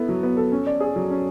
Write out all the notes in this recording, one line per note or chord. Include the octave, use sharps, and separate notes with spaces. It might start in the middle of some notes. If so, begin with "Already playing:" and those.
Already playing: B3 E4 A4
F#3
B3
A4
C#4
D5
G#4
F#3
C#4